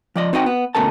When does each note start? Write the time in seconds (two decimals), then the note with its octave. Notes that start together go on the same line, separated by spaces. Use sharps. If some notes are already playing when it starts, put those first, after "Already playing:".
0.16 F3 D5 D#5
0.33 C4 D#4 F#4 D#5 E5 G5
0.46 B3
0.75 D2 B2 A3 C#4 A#4 A5